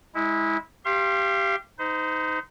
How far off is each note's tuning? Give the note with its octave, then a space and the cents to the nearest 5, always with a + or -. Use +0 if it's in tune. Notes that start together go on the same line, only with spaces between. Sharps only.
G#3 +0 E4 -20
G4 +0 F5 -30 C6 +25
D#4 +10 C5 -35